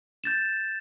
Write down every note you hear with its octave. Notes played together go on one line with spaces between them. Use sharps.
G6 A6 E7